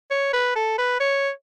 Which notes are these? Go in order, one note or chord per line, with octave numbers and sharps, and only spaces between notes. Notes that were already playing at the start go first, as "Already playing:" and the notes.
C#5
B4
A4
B4
C#5